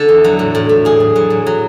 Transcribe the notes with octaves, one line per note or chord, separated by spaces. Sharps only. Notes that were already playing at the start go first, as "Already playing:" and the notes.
Already playing: D3 D4 A4
E2
F#3
A2
A2
A2
A2 G#4
A2
F#3
A2
F#3